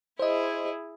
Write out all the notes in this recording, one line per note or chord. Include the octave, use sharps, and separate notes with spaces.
E4 G#4 C5 D#5